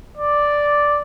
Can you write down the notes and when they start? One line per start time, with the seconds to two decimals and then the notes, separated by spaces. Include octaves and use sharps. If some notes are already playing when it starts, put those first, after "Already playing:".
0.17 D5